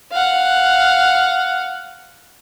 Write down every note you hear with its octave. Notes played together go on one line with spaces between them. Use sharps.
F5 F#5